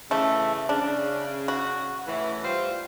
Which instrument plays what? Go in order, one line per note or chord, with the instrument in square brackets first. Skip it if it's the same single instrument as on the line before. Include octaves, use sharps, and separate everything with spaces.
[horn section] C#3 E3 [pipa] A3
[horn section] C#3 [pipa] D4
[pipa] F#4
[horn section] A2 E3
G3 F4 C5